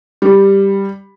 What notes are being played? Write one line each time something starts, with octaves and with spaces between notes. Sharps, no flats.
G3